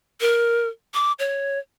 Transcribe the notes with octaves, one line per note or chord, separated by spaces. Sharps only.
A#4
D6
C#5